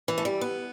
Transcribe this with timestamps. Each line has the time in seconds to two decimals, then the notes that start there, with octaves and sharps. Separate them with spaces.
0.08 E3
0.18 A3
0.25 G3
0.41 B3